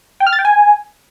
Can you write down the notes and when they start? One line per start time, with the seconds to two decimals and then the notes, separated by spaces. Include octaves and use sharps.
0.20 G5
0.26 F6
0.33 A6
0.39 G5
0.45 G#5